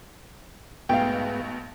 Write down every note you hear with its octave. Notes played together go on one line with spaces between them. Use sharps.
B1 G#2 B2 A3 B3 F5 G5